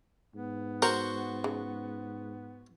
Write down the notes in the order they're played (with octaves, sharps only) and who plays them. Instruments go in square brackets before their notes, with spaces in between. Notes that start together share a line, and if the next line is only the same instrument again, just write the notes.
[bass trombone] G#2 [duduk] B3
[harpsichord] F#4 C5 C#6 [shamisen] A#4
[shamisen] C#3